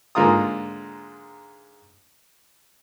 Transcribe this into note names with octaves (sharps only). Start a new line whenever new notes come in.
G#2 D3 A#3 F4 A#5 D#6